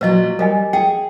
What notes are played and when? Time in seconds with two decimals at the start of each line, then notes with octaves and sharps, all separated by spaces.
0.01 A#2 F#3 B4 D#5
0.39 G3 A#4 D#5 G#5
0.73 G#4 G5